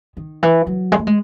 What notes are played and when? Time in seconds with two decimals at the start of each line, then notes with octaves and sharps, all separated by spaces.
0.17 D#3
0.43 E3
0.67 F#3
0.92 G#3
0.99 A3
1.07 G#3